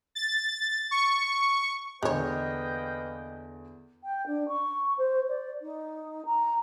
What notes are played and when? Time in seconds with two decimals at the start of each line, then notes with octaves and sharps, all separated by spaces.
0.15 A6
0.91 C#6
2.03 E2 D3 G#3 A#3 B4 C#5 D#5 G5
4.04 G5
4.27 D4
4.48 C#6
4.98 C5
5.29 D5
5.62 D#4
6.25 A#5